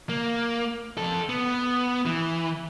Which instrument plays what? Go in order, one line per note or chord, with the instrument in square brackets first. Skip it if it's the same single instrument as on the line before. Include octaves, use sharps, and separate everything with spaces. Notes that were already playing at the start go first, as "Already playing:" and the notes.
[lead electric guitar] A#3
F2 A4
B3
E3